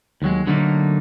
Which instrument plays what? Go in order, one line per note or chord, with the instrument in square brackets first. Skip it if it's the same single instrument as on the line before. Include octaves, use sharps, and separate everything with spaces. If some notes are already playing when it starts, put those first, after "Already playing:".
[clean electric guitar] D#2 F#3 G#3
D3 F#3 A3 A#3 D#4